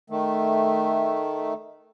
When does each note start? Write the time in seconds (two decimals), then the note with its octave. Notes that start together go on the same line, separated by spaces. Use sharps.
0.10 D#3 A3